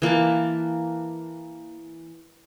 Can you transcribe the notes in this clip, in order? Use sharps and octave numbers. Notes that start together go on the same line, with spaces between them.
E3 A#3 D5 A5